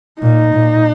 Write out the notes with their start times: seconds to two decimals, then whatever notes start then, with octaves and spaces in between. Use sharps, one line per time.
0.21 A#2 D#4
0.53 A#2